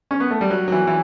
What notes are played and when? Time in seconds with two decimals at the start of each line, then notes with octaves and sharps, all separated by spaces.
0.11 C#4
0.20 B3
0.31 A3
0.41 G3
0.50 F#3
0.68 F#3
0.72 E3
0.87 E3